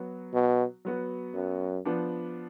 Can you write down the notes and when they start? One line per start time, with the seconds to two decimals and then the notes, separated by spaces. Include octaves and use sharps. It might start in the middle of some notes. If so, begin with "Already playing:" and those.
Already playing: F#3 B3 F#4
0.34 B2
0.85 F#3 B3 F#4
1.34 F#2
1.85 F3 B3 D4